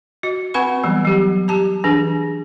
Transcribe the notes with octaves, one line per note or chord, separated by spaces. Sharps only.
F#4 D#5
C4 B4 F#5 G#5 B5 C#6
E3 F#3 G3 B3
F#3 G4
G4 A5 A#5
E3 D4 G#4